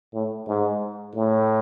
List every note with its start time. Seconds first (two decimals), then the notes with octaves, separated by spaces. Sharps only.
0.13 A2
0.47 G#2
1.15 A2